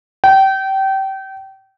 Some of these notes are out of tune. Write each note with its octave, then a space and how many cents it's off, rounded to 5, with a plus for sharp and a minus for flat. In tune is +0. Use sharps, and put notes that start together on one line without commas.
G5 -25